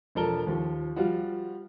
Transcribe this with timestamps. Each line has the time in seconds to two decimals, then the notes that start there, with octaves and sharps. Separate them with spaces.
0.15 E1 F3 A4 A#4 G7
0.47 D#2 F3
0.96 F3 G3 F4 F#4